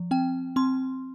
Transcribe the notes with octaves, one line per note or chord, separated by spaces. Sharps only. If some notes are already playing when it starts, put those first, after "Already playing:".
Already playing: F3
C4 G5
C4 C6